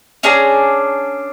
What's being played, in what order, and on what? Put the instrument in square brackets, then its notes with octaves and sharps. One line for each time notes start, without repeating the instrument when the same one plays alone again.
[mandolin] C#4 D4 G#4 A#5